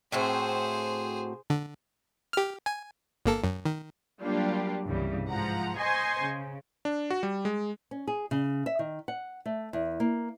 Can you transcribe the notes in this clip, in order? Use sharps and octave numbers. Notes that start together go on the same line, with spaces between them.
A2 C4 F#4 G#4 C5
D3
G4 F6
G#5
G1 A#3 A4
F#2
D#3
F#3 G3 A#3 D4 F4 G4
C2 G2 C#3 E3 G3
G#2 F3 F#5 A#5
C5 D#5 G#5 C6 C#6
C#3
D4
F#4
G3
G#3
C#4
G#4
C#3
E5
D#3
F#5
A3
E2
A#3